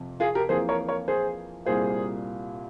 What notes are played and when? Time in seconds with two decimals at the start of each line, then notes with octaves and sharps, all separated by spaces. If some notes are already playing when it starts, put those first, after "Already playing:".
Already playing: F2 C3
0.20 F4 G#4
0.35 G4 A#4
0.49 F2 E3 A#3 G#4 C5
0.69 A#4 C#5
0.88 A#4 C#5
1.08 G#4 C5
1.66 C2 A#2 G3 A#3 G#4 C5